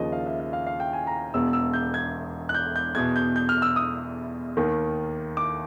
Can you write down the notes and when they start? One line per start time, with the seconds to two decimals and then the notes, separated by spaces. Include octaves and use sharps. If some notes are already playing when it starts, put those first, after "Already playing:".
Already playing: D#2 C#3 F3 D#5
0.12 F5
0.26 E5
0.40 E5
0.53 F5
0.67 F5
0.80 G5
0.93 G#5
1.07 A#5
1.34 E1 E2 B2 E6
1.53 E6
1.73 G6
1.94 G#6
2.49 F#6
2.54 G6
2.76 G6
2.95 E2 B2 G#6
3.16 G6
3.36 G6
3.49 F6
3.62 E6
3.76 D#6
4.57 D#2 D#3
5.37 D6